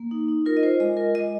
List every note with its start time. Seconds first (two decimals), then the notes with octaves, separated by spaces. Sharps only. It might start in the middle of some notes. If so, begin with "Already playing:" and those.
Already playing: A#3
0.11 D#4
0.28 D#4
0.46 F4 A#4
0.57 D#5
0.63 F4 C5
0.80 G#3 D#5
0.97 F4 A#4
1.15 G#3 D#5